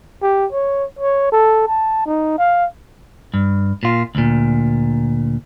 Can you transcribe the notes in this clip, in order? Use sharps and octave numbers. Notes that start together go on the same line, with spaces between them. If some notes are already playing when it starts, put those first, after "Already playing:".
G4
C#5
C#5
A4
A5
D#4
F5
G2
A#2 F4
D2 A#2